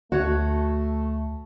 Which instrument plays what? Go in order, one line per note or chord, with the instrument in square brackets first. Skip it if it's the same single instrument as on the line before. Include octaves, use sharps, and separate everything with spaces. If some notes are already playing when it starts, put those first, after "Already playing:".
[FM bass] D2 [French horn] A3 [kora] F#4 C#5 F#5